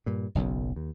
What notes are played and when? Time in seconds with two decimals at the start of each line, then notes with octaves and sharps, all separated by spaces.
0.06 G2 A#2
0.35 F#1 B1 F#2
0.76 D#2